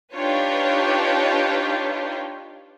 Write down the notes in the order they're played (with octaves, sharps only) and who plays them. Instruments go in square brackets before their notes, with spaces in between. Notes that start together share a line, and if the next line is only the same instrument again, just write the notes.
[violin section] D4 D#4 F4 G4 B4 C#5